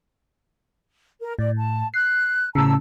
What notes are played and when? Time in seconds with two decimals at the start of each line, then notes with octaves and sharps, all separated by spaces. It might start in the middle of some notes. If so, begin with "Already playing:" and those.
1.21 A#4
1.39 A2 D5
1.57 A5
1.94 F#6 C7
2.55 A2 C#3 A5 A#5 E6